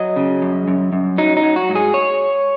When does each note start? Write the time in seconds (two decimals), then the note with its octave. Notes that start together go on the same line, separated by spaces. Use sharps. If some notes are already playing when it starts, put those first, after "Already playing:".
Already playing: F#3 D#5
0.16 C#3
0.42 F#2
0.68 F#2
0.93 F#2
1.18 F#3 D#4
1.37 D#4
1.43 F#3
1.56 F#4
1.69 G#2
1.75 G#4
1.94 C#5